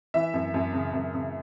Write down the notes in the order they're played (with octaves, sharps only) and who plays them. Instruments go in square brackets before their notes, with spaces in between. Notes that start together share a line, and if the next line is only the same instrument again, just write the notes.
[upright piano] E3 E5
F#2
F#2
C#3
F#2
C#3